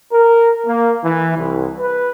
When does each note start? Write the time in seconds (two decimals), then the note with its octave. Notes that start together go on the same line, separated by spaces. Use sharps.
0.13 A#4
0.66 A#3
1.03 E3
1.36 C2
1.79 B4